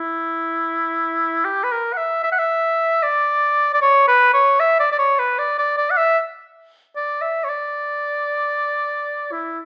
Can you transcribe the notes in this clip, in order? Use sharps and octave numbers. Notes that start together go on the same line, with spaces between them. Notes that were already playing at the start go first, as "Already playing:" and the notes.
Already playing: E4
G4
B4
A#4
F#5
E5
E5
F#5
E5
D5
D5
C#5
B4
C#5
E5
D5
D5
C#5
B4
D5
D5
D5
F#5
E5
D5
E5
C#5
D5
E4